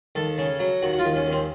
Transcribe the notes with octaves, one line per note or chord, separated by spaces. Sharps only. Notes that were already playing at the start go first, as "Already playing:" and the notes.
D#2 A4
C#3
F#3
D#2 F#4
F#4
F4
D#2
C#4
D#2
C4